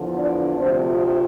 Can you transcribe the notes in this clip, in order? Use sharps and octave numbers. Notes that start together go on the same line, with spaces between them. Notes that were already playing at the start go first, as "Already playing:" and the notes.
Already playing: E2 D3 F3
D4 D5
D2 C3 F3 A3 C4 C5